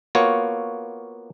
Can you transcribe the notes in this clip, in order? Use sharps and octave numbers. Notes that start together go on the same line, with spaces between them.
A#3 B3 F4 F#4 C#5